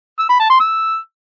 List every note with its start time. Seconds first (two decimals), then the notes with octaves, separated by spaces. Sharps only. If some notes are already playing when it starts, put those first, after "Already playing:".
0.19 E6
0.29 B5
0.40 A5
0.50 C6
0.60 E6